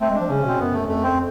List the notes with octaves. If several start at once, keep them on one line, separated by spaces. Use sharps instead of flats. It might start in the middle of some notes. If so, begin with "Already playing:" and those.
A3 C4
G#3 D4
F3
C#3 C#4
B2 C4
F#2 B3
A3
F2 A3
F2 C4